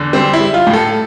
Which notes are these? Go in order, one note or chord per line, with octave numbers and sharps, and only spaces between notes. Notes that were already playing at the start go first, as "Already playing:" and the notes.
Already playing: E2 D3
G3 C4
E4
G3
F4
A2
A4